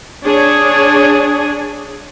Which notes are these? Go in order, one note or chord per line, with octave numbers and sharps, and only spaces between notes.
D4 G#4 C#5